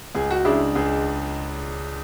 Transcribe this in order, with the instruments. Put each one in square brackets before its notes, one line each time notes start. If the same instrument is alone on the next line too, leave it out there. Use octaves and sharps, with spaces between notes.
[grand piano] C#2 [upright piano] G#4
[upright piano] F#4
[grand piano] C#3 G#3 D4 [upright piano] E4
[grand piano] C#2 [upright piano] G#4